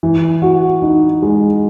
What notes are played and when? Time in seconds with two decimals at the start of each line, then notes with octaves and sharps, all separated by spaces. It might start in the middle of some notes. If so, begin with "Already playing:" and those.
0.03 E3
0.42 F#4
0.82 D#4
1.22 G#3